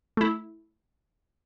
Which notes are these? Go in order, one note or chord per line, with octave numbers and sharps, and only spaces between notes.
A3 E4